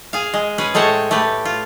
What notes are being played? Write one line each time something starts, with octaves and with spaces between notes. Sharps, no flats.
G#4 F5
G#3
C#4 G#4 B4
A2 G#3 A3 C5 C#5
A3 G4 B4
F4